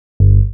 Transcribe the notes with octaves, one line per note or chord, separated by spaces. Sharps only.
G1